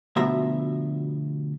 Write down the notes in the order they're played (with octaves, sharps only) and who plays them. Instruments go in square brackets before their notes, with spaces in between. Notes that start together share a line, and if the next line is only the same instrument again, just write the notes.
[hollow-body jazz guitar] D2 B2 F3 E5 A#5